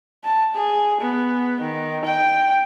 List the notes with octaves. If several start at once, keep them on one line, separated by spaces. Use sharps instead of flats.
A5
G#4
B3
D#3
G5